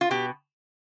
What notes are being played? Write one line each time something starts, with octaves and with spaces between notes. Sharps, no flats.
F4
B2 G4